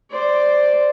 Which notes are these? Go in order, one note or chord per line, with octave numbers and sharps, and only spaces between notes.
C5 D5